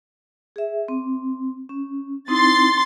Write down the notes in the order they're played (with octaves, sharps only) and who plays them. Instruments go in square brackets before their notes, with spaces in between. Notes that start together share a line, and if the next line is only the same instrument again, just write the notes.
[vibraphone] G#4 E5
C4
C#4
[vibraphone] C4 D#4 E4 [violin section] C6 A6